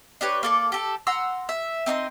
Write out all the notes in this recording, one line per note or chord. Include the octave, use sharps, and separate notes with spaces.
D4 G4 B4 C#5
A#3 A4 D5
G4 A4
F#5 A#5 C6 E6
E5
C4 D#4 G#5 C6